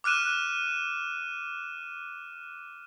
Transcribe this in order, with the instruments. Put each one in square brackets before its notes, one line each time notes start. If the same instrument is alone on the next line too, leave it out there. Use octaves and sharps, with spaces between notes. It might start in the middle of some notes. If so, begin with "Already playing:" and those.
[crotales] D6 F6 F#6 D#7 E7